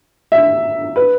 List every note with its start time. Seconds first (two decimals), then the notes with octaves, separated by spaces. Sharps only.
0.32 E5
0.96 B4